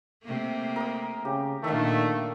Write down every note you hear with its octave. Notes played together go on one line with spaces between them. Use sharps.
C3 A3 A#3
A#4 D#6
C#3 G4
A#2 D3 D#3 A3 E5 F5